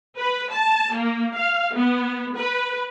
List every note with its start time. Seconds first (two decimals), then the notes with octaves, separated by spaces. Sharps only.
0.17 B4
0.52 A5
0.94 A#3
1.35 F5
1.73 B3
2.37 B4